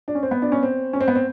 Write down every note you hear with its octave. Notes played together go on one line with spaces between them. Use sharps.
D4
C#4
C4
B3
D4
C#4
C4
C#4
C4
B3
C4